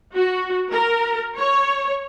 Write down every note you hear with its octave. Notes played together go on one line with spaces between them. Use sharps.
F#4
A#4
C#5